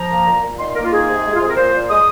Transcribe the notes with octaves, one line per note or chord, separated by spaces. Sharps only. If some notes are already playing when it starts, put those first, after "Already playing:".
Already playing: F3 A#5
A#3
A#2
A#2
D#3 C6
A#3 A#4
F4
D#4 G#4
C3
G#3
F4
C4 G#4
A#4
A#2 C5
A#2
G#3 D#6